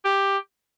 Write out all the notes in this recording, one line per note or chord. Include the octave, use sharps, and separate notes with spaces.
G4